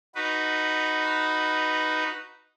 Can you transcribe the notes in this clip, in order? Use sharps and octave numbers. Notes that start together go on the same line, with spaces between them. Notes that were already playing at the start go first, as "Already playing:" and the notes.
D#4 F#4 B4